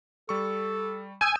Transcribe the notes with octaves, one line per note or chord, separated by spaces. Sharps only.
G3 A4 C#6
G#5 D#6 E6 G6